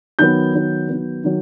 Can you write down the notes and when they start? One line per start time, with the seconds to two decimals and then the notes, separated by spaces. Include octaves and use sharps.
0.19 D#3 F#3 B3 G6
0.54 D#3 F#3 B3
0.89 D#3 F#3 B3
1.24 D#3 F#3